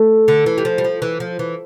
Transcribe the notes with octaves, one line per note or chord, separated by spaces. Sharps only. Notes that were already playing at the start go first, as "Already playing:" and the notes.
Already playing: A3
D3
E3
G3
F3
G3
F3
E3
F3
E3